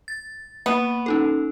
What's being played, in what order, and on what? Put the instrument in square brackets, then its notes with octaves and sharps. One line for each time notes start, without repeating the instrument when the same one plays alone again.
[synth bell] A6
[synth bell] A#3 [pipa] B3
[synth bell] C#4 D#4 A4